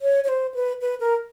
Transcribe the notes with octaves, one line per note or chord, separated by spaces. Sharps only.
C#5
C#5
C5
B4
B4
A#4